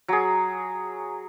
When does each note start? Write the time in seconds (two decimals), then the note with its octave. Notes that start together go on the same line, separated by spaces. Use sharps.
0.08 F#3 G#4